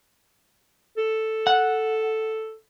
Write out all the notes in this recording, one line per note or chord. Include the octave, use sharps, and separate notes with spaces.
A4
F#5